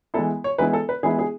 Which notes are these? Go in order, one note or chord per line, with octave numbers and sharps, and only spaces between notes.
E3 G#3 B3 E4 A4
C#5
E3 G#3 B3 E4 B4
A4
B4
E3 G#3 B3 E4 G#4
G#4